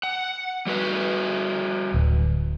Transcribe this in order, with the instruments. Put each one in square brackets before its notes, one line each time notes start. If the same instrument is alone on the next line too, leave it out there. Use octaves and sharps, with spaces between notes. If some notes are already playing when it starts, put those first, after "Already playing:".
[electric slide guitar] F#5
G3 F#4 B4
[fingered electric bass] D1